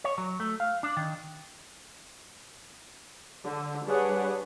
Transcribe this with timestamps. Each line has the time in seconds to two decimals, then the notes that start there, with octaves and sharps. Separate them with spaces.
0.04 C#5
0.18 F#3
0.40 A3
0.60 F5
0.83 D4
0.97 D#3
3.44 D3
3.86 G3 D4 G#4 B4 C#5 F#5